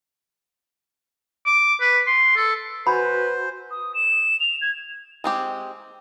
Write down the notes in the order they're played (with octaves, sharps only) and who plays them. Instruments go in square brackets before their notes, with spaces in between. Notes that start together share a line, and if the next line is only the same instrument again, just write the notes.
[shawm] D6
B4
C6
A4
[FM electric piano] F#4 G#5 [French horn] B4 [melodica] C5 [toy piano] B5
[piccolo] D#6
E7
F7
G#6
[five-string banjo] G#3 C4 G4